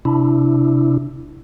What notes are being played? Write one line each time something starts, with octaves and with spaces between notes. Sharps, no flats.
C3 D4 E4